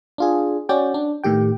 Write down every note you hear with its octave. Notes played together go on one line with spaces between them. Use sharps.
D4 F4 G#4
C#4 F#4 D5 G5
D4
A2 D#3 G4 G5